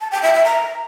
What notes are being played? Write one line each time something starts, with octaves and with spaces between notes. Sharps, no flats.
A5
G5
E5
E5
A#5